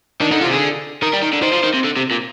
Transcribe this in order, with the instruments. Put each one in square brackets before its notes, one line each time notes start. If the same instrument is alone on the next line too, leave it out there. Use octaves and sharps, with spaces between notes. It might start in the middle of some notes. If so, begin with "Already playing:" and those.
[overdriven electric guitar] D#3 [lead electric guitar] D4
[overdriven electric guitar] D3 [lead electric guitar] D#4
[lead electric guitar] F4
[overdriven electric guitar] C3
[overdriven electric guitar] D3 [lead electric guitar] G#4
[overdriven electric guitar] D#3 [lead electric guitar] A#4
[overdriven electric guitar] G3
D#3
D3
[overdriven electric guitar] D#3 [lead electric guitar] C5
[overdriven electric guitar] F3
D#3
C3
D3
C3
A#2